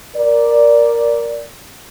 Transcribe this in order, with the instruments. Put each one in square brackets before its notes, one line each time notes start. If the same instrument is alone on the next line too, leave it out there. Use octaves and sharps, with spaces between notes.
[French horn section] A#4 D5